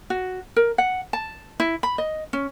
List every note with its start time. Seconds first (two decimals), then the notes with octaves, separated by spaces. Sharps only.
0.10 F#4
0.56 A#4
0.78 F#5
1.13 A5
1.60 E4
1.83 B5
1.98 D#5
2.33 C#4